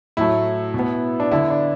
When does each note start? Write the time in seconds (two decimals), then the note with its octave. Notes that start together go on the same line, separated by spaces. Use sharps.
0.17 A2 F#3 A3 E4
0.74 B2 B3
1.20 D4
1.31 D3 B3 E4
1.50 D4